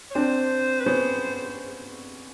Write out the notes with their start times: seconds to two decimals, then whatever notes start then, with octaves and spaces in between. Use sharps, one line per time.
0.11 C#5
0.15 C4 D4 C5
0.81 B4
0.86 B3 C#4 C5